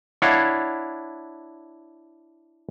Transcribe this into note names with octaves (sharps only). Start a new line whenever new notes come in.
D4 E4 C#5 F5 F#5